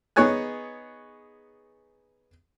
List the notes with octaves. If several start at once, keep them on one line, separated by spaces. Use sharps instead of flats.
B3 D#4 G#4 C#5 G#5 F#6